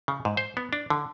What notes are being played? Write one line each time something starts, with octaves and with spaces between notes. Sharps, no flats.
C#3
G#2
C5
B3
D4
D3